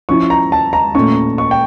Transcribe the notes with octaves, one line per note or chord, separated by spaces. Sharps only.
F3 C#4 E4 C#6
A#5
A5
A#5
A#2 A3 C#4 C#6
C#6
G5